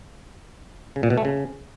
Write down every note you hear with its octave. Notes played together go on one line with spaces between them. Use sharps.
C#3
A#2
B2
A3
C#3